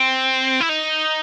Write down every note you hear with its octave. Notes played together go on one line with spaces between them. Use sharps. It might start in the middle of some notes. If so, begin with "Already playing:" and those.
Already playing: C4
E4
D#4